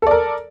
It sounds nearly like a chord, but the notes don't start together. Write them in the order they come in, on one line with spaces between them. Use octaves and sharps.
A4 D5 A#4